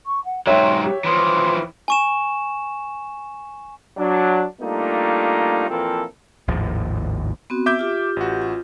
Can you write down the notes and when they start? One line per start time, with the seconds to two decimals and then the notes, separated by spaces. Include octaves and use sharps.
0.06 C#6
0.24 F#5
0.47 G#2 F#3 C#5 E5 G5 C6
0.83 G4
1.04 E3 F3 C6
1.88 G#5 C#6 E7
3.97 F#3 D4
4.61 G3 A3 A#3 D4 D#4 F4
5.69 A#2 E3 F3 C4 A4 A#4
6.48 G#1 D#2 A2 F3
7.50 B3 C4 F#4
7.66 E5 D6 G6
7.79 F4 G4
8.16 A1 F#4
8.42 F4